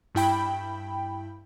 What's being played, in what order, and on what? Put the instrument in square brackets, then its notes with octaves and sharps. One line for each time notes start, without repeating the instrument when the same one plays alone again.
[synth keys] G2 E4 G5 B5